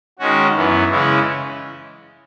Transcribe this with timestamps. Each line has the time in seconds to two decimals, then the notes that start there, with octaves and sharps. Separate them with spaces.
0.19 D#3 G#3 C#4 F#4
0.55 F#2 E3 B3
0.90 C#3 E3 G#3 C#4 E4